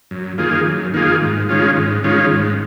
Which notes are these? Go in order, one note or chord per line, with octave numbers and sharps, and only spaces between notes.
F#2
D#3 A#3 F4 G#4
F#2
D#3 A#3 F4 G#4
G#2
D#3 G#3 C#4 F4
G#2
D#3 G#3 C#4 F4
G#2